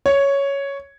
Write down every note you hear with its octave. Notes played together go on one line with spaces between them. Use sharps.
C#5